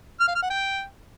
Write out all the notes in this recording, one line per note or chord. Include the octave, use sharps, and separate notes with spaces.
F6
F5
F6
F#5
G5